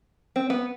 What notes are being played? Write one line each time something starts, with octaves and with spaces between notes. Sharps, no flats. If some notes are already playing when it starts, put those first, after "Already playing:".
C4
B3